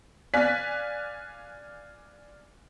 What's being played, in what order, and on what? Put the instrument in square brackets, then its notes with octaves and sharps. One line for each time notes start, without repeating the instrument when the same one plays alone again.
[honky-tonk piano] D5 F5 G#5 F#6 B6